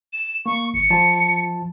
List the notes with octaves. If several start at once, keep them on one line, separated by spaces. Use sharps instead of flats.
E7
A#3 C#6
G1 C#7
F3 F4 A5